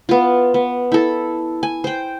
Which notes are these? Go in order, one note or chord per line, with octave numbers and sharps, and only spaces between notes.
B3 F4
B3
E4 A4
G#5
C5 G5